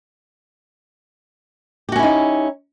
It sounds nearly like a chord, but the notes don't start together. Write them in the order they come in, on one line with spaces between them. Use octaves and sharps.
G4 F#4 C#4 E4 D#4